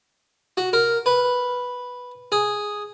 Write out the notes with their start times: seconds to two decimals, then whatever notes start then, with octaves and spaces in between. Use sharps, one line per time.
0.57 F#4
0.73 A#4
1.06 B4
2.32 G#4